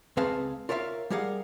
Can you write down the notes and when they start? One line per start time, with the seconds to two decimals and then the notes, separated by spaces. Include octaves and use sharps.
0.17 C#2 C4 G#4 B4 F5 A5
0.69 F4 A#4 C#5 E5 F5
1.10 G3 G4 G#4 A#4 F5 F#5